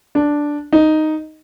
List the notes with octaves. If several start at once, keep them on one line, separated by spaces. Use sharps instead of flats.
D4
D#4